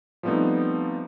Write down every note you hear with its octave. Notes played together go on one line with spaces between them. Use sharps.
F3 G3 A3 B3 C4 D#4